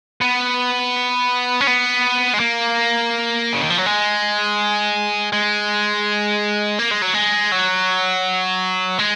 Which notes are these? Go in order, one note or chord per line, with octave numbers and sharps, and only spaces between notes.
B3
C#4
B3
G#3
A#3
C#3
D#3
F3
F#3
G#3
G#3
A#3
G#3
F#3
G#3
F#3
G#3